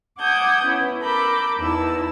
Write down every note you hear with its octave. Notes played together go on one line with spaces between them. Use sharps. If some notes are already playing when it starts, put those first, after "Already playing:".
F#5 A5 D6 D#6 G6 G#6
B3 C#4 E4
A4 A#4 B5 D6 G6
E2 D#4 E4 A5 E6